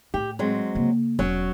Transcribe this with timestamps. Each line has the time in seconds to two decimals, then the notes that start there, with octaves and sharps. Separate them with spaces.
0.14 A2 G4
0.39 F#3 G#3 C4
0.75 C#3 A#3
1.19 E1 F#3 C#4